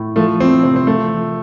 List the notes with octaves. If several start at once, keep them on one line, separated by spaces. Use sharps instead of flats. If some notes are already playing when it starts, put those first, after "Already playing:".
Already playing: A2
F3 A3
F3 C4
C3 C4
C4
F3 A3
F3